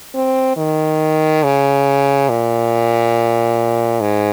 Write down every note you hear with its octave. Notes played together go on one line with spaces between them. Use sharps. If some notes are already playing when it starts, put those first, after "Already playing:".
C4
D#3
C#3
A#2
G#2